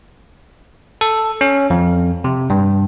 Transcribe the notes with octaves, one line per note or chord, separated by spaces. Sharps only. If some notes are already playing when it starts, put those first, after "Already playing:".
A4
C#4
F2
C3
G2